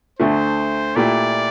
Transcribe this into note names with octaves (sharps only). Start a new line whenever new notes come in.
D2 D3 A3 C5
A#2 A3 E4 G4 D5